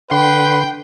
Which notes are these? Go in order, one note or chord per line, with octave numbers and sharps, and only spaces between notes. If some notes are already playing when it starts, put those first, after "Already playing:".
D3 B4 G5 C6